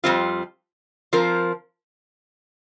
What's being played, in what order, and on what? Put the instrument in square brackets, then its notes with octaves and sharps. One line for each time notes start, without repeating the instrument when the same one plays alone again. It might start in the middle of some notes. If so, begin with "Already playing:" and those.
[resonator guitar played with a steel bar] F2 C3 G3 C4 F4
F3 C4 F4 A#4